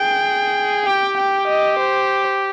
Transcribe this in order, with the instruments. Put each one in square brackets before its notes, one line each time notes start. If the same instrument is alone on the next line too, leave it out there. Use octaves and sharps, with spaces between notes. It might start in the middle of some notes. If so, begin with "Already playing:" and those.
Already playing: [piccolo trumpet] G#4 [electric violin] G5
[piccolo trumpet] G4 [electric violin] G5
[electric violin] G5
D#5
C5